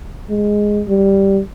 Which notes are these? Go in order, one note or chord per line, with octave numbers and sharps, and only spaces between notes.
G#3
G3